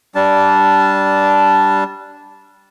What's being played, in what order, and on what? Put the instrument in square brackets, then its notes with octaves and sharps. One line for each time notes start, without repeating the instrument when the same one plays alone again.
[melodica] G3 D4 A5